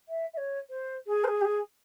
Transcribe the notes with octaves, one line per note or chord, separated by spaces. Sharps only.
E5
E5
C#5
C5
G#4
C5
G#4
G4
G#4